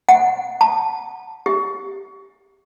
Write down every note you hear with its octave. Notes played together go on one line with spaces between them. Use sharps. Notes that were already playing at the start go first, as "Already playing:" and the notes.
F#5
A5
G4